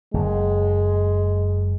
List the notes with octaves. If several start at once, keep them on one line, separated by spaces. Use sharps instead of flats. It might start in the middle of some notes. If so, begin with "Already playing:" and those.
F#1 G#3